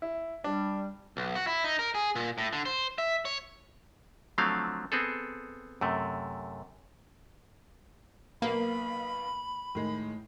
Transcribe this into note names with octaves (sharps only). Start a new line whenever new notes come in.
E4
G3 D4
B1
F#4
E4
D#4
A#4
G#4
A#2
A2
D3
C5
E5
C#5
D3 F3 F#3 A3 C4 F5
B3 C4 G#4 A4
F#2 C3 A3
B1 A#3 B3 F5 B5
A2 D#3 G#3